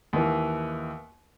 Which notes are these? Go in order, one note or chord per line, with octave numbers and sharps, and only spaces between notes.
D#2 E3